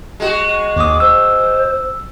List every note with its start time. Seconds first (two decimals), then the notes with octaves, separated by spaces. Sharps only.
0.20 G#3 F#4
0.76 D#2 D6 D#6
1.00 C5 E6